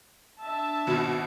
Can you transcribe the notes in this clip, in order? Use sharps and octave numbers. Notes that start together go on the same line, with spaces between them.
D4 E5 A5
G#1 B2